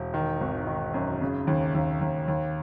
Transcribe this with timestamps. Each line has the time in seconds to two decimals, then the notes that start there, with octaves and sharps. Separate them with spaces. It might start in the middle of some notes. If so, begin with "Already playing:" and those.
Already playing: E1
0.14 D#3
0.41 G#1
0.67 D#3
0.94 F#2
1.21 C#3
1.47 D#2
1.74 D#2
2.01 D#2
2.28 D#2